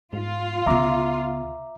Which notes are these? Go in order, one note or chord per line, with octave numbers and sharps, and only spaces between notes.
G#2 F4
C#2 C#3 B3 E5 A#5 D6